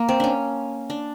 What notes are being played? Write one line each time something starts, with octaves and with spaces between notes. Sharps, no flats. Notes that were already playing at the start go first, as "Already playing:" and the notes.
Already playing: A#3
C4
C#4 D4
D4